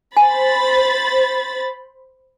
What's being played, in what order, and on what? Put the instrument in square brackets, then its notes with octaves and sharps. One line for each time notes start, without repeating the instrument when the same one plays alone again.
[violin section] C5 B5 A6 [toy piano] G#5